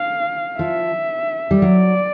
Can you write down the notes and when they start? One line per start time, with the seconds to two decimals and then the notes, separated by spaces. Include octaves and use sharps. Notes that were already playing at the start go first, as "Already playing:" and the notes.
Already playing: F5
0.59 F3 E5
1.51 G3
1.62 F#3 D5